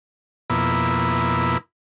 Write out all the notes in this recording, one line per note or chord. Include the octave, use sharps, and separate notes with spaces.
F2 B2 A#3 E4 B5